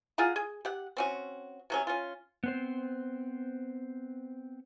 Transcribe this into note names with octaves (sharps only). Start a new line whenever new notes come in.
F4 G#4 F#5 A#5
G#4
G4 F#5
C4 C#4 F#4
C3 F#3 C#4
C#4 F4
B3 C4 C5